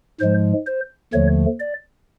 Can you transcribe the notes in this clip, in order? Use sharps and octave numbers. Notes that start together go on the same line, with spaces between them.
G#2 F3 G#3 C5
C5
D#2 D3 F3 A3 C#5
D5